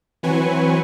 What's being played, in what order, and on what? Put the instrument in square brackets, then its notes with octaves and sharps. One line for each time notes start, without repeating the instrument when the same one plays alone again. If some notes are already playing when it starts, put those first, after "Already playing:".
[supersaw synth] E3 F#3 C4 B4 G#5 C#6